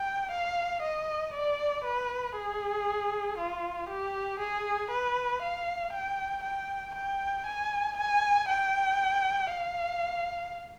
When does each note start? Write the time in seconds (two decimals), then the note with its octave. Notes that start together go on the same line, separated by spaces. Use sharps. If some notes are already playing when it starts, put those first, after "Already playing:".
Already playing: G5
0.31 F5
0.82 D#5
1.34 D5
1.84 B4
2.36 G#4
3.38 F4
3.89 G4
4.40 G#4
4.91 B4
5.42 F5
5.93 G5
6.43 G5
6.95 G5
7.47 G#5
7.97 G#5
8.48 G5
9.50 F5